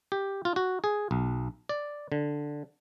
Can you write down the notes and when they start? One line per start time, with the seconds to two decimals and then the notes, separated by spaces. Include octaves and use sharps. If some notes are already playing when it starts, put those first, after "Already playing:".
0.12 G4
0.45 F4
0.56 F#4
0.84 G#4
1.11 B1
1.69 D5
2.12 D3